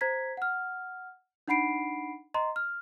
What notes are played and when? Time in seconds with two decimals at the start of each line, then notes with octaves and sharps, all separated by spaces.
0.01 C5 A#5 G#6 B6
0.37 F#5 F6
1.48 D4 D#4 F#5 B5 C7 D7
2.34 D#5 A#5 C6
2.56 F6